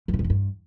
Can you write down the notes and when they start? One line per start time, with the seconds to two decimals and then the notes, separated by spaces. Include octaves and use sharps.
0.08 F2
0.14 C#3
0.19 F#2
0.24 E2
0.30 G2